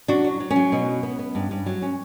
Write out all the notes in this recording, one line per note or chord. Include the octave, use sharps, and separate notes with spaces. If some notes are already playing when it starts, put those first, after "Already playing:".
F#3 D4 F#4
F#3
F#3
C#4
F#3
B2
B3
B3
B3
G2
G2
F#3
C#4